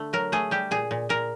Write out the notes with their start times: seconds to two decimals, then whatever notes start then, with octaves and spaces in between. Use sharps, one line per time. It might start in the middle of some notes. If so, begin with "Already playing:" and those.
Already playing: D3 A3
0.13 F#3 A#4
0.32 A3 G#4
0.51 G3 G4
0.71 A#2 G#4
0.91 A#2
1.09 A#2 A#4